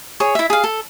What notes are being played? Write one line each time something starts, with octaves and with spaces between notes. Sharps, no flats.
G#4 C#5
E4 E5
G#4 F5
A4